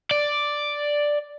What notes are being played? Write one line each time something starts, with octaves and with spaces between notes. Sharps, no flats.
D5